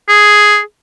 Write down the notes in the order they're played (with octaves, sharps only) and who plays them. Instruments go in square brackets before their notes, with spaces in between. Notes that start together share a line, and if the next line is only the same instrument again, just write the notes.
[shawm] G#4